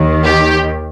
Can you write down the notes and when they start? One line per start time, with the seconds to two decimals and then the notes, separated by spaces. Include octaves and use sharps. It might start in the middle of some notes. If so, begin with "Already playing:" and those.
Already playing: D#2 D#3
0.24 G4